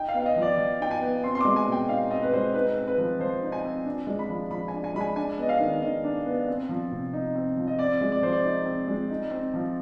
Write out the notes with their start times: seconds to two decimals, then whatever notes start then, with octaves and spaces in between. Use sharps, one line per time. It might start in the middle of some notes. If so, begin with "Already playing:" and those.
Already playing: D#4 G5
0.08 F5
0.14 B3
0.20 F5
0.26 D#5
0.36 F3
0.42 D5
0.57 F3 D#5
0.80 D#4 G5
0.91 G#5
1.01 B3
1.24 C4 C6
1.35 C6
1.41 G#3 D6
1.56 G#5
1.67 B2
1.72 G5
1.89 D#4 F5
2.11 C4 D#5
2.22 B4
2.33 G#3 C5
2.54 D#4 B4
2.76 C4
2.88 B4
2.98 F3
3.20 F3 C5
3.43 D#4
3.52 G#5
3.64 C4
3.85 D4
4.07 G#3
4.19 B5
4.29 F3
4.51 F3 B5
4.68 G#5
4.73 D4
4.84 G#5
4.94 G#3 B5
5.01 G#5
5.16 D4 G#5
5.38 B3 D#5
5.49 F5
5.60 D#3
5.82 D#3 D#5
6.04 D4
6.26 B3
6.48 C4
6.69 F3
6.91 C3
7.13 D#4
7.35 C4
7.57 F3
7.67 D#5
7.79 C4 D5
8.01 G#3
8.12 D5
8.22 F3 C5
8.33 D5
8.45 D#4
8.66 C4
8.88 G#3
9.10 D#4
9.31 C4
9.54 F3